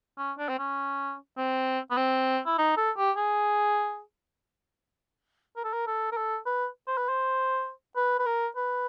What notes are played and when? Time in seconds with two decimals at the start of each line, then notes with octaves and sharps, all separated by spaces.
0.18 C#4
0.38 D4
0.49 C4
0.59 C#4
1.38 C4
1.91 B3
1.97 C4
2.46 E4
2.58 D#4
2.77 A4
2.97 G4
3.17 G#4
5.57 A#4
5.64 A4
5.73 A#4
5.87 A4
6.12 A#4
6.17 A4
6.46 B4
6.87 C5
6.97 B4
7.09 C5
7.96 B4
8.19 B4
8.26 A#4
8.56 B4